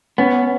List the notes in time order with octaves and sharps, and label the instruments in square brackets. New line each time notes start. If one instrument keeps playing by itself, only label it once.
[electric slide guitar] B3 [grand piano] C#4